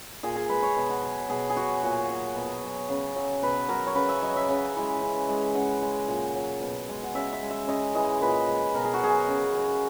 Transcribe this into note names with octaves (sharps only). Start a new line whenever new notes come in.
A#2 G#4
G#4
G#3 B4
C#5
B2
F#5
F#3
B2 G#4
G#4
F#3 F#4
A#2
F#3
B2
F#3
C#3
F#3
B2 B4
F#3 A#4
C#5
C#3 B4
E5
F#3 D#5
E5
C#3
E3 G#3
C#3
G#3
C#3 F#5
G#3
A#2
F#3
B2
G#3
F#5
C#3 E5
E5
G#3
E5
C#3 D#5
E3 G#3 D#5
A#2 B4
G#3
B2 A#4
G#4
F#4
F#3 G#4
C#3
F#3